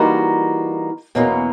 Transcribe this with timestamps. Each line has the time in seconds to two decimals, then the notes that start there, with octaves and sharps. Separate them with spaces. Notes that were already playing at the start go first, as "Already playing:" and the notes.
Already playing: E3 G3 A#3 D#4 F#4
1.15 E2 B2 F#3 A#3 C#4